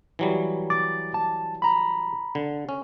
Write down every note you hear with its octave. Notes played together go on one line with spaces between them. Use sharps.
E3 F#3 G3
D6 A6
A5
A#5 B5
D3
C#4